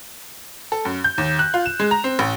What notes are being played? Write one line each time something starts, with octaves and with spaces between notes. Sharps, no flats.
A4
F#2
G6
D#2
F#6
F4
E7
G#3
A#5
C4
A1